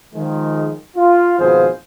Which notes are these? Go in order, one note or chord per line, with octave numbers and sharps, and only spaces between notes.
D#3 F3 G#3
F4
G#1 B2 F3 F4 G#4 C5